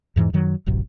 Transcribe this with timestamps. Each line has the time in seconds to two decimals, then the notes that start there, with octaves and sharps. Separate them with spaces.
0.16 E2 G#2 E3
0.33 F#2 D#3 F#3
0.66 D1 A1 F#2 C3